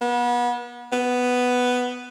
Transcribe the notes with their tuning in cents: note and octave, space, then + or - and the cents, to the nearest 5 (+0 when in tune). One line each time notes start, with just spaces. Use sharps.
B3 -30
B3 +5